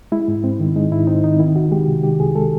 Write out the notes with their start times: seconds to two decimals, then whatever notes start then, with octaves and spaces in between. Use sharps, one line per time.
0.12 G#3 E4
0.28 G#2
0.44 C4
0.60 D#3
0.76 G#3 D#4
0.92 G#2 E4
1.07 C4 D#4
1.24 D#3 D#4
1.39 D#3 E4
1.56 C2 F#4
1.72 G#3 G4
1.88 C3
2.03 D#3 G4
2.20 C2 G#4
2.35 G#3 A4